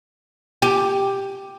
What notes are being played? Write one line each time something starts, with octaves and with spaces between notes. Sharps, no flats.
G4